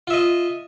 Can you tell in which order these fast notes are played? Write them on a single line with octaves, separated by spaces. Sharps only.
F4 E5 D#5